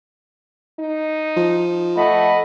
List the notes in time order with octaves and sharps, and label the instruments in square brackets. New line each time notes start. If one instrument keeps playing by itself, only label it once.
[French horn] D#4
[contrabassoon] F3
[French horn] A3 [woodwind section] D#5 F#5 B5